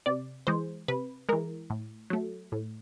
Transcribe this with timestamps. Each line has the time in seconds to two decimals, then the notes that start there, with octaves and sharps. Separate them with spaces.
0.06 C3 D5
0.47 E3 G#3 C5
0.88 C3 B4
1.29 E3 G#3 A#4
1.70 A2
2.10 F#3 A3
2.52 A2